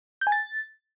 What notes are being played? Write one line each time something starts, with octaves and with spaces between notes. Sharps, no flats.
G6
G#5
A6